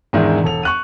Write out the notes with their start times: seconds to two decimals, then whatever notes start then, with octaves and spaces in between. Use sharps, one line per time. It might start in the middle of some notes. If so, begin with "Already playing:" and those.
0.13 E2 G#2 D#3 G#3 D4 E4
0.43 E1 A4 F7
0.63 C#6 F#6 D#7